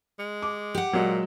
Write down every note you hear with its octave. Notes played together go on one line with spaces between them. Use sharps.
G#3
D6
G4 F#5
A#2 F#3 G#3